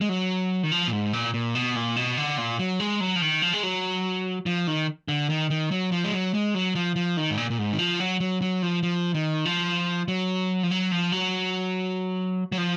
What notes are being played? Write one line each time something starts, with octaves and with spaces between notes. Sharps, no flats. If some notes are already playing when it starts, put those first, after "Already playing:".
G#3
F#3
D#3
F3
A#2
G#2
A#2
A#2
B2
A#2
B2
D3
A#2
F#3
G#3
F#3
F3
D#3
F3
G#3
F#3
F3
D#3
D3
D#3
D#3
F#3
F3
G#3
F#3
G#3
F#3
F3
F3
D#3
G#2
A#2
A#2
G#2
D#3
F3
F#3
F#3
F#3
F3
F3
D#3
F3
F#3
F3
F#3
F3
F#3
F#3
F3